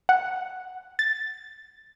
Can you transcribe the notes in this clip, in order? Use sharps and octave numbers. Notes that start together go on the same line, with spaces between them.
F#5
A6